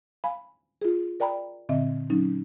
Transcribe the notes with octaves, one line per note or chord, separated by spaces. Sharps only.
F5 G#5 B5
F4 G#4
A#4 D5 G5 A#5 B5
A#2 D3 C4 D#5 E5
F#3 C#4 D#4